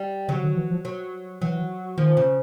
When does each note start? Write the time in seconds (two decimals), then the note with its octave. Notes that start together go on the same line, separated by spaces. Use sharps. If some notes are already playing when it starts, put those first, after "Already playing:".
Already playing: G3
0.28 C#3 F#3
0.43 D3
0.56 E3
0.71 F3
0.85 F#3
1.41 E3 F#3
1.97 D#3 F3
2.17 C#3